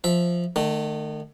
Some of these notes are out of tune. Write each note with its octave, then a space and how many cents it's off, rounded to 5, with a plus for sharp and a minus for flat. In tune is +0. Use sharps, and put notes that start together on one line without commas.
F3 +0 E5 -5
D#3 -40 A3 +0